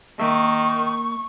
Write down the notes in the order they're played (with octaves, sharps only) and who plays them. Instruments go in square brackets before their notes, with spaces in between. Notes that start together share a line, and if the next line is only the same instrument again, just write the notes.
[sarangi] D#3 [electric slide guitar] A#3 E5 [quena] C#6